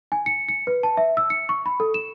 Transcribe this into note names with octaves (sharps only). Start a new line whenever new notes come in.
G#5
C#7
C#7
B4
A5
E5
E6
C#7
C#6
B5
A4
E7